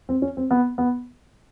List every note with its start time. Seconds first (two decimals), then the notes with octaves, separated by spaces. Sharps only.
0.09 C4
0.22 C#4
0.37 C4
0.51 B3
0.78 B3